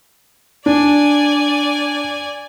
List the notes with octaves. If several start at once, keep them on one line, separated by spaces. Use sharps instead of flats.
D4 D5 G#5